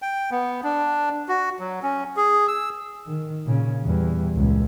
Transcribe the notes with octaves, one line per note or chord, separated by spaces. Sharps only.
G5
B3
D4
F#4
F#3
C#4
G#4
E6
D#3
A#2 C#3
E2 G3
C#2 A#2